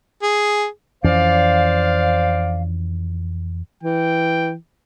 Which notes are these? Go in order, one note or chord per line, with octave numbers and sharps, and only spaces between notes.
G#4
F2 E3 C#4 C5 D5 F5
E3 G5